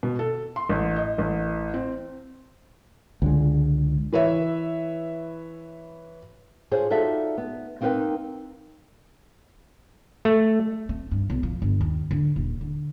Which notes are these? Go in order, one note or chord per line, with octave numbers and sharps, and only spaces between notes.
B2
A4
C6
A1
D#5
A1
C4
C#2 D3 G#3
E3 B4 C#5 E5
D4 F4 G#4 C5 C#5
D#4 F4 F#4 A4 D5 E5
B3
A#3 C4 D#4 A#4 B4 G5
A3
C4
G2
B1
F3
G1
D#2
D3
D#1
D3